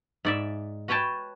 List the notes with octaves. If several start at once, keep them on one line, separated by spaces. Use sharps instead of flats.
G#2 D5 E5
F#4 B4 C#5 G5 A5